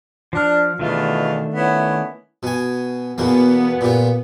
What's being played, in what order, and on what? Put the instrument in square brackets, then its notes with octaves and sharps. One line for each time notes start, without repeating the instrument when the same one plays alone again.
[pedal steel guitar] F3 F6 [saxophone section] D4
[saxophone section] E2 B2 F4 [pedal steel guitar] D#3 A3 D4
[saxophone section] B3 C#4 E4
[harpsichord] B2 G#5
[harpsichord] E2 B2 A#3 [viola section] B3
[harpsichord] A#2 G4